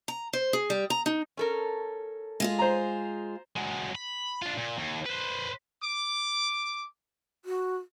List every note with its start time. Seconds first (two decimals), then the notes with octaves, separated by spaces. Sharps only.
0.08 A#5
0.33 C5
0.53 G#4
0.70 G3
0.90 A#5
1.06 D#4
1.37 C#4 A4 A#4
2.40 G#3 F4 G#4
2.59 C5 A#5
3.56 F#3 G#3
3.95 B5
4.42 D4 F4
4.58 A#2
4.78 D#2
5.05 B4 C5
5.82 D6
7.45 F#4